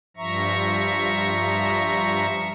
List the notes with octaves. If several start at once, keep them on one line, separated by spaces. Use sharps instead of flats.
G2 F3 E5 A#5 C#6